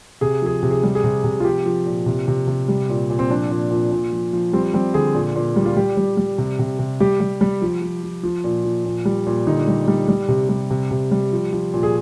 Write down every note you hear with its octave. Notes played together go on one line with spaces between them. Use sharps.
C3 G#4
F3 G#4
C3
G#4
G3
G#4
C3
C3
F4
F3 G4
F3
A#2
C3
C3
C3
G3
A#2
A#2
C4
F3 D4
A#2
A#2
A#2
F3
F3
G3 C4
G3 C4
D3 G#4
A#2
A#2
G3
F4
G3 G4
G3
G3
C3
C3
C3
G3 G4
G3
G3
F3
F3
F3
F3
A#2
F3
A#2
G3
A#2
D3 D#4
G3
G3
G3
C3
G3
C3
C3
G3
F3
F3
A#2
G#4